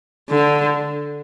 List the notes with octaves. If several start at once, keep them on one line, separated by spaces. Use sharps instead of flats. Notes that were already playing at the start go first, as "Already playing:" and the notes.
D3